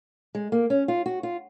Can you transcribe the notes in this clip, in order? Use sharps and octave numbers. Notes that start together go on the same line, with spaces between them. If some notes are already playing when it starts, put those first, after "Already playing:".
G#3
A#3
C#4
F4
F#4
F4